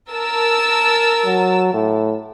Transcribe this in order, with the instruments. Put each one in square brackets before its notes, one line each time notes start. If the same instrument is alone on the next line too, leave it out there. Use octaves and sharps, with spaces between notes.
[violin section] A#4 A5 E6
[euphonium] F#3
A2